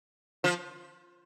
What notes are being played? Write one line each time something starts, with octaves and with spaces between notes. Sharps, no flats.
F3